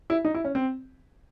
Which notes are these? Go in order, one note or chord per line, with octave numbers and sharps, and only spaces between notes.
E4
D#4
E4
C#4
C4